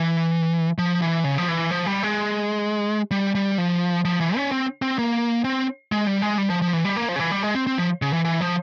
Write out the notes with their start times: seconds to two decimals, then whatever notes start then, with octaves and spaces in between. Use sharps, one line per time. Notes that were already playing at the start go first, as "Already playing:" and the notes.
Already playing: E3
0.78 F3
1.02 E3
1.24 C#3
1.38 F3
1.48 E3
1.71 F3
1.86 G3
2.03 G#3
3.11 G3
3.35 G3
3.58 F3
4.05 F3
4.20 E3
4.36 C#4
4.52 C4
4.82 C4
4.99 A#3
5.44 C4
5.92 G#3
6.07 G3
6.22 G#3
6.38 G3
6.50 F3
6.62 F3
6.73 E3
6.85 G3
6.97 A#3
7.09 F3
7.16 C#3
7.20 E3
7.31 G3
7.43 G#3
7.55 C4
7.67 C4
7.78 F3
8.02 C#3
8.13 E3
8.25 E3
8.41 F3